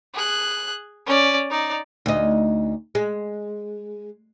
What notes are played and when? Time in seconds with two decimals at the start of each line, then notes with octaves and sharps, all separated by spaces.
0.14 G#4 F#6
1.06 C#4 D5
1.50 D#4 D5
2.06 D2 D#4
2.95 G#3